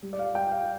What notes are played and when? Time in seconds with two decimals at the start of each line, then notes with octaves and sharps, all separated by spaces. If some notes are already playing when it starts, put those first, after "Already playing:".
0.03 G3
0.13 D5
0.19 F5
0.35 G3 G5
0.52 F5